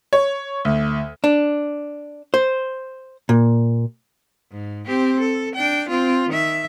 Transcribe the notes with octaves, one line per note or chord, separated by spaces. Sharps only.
C#5
D2
D4
C5
A#2
G#2
C4 G4
A4
D4 G5
C4 F4
D#3 E5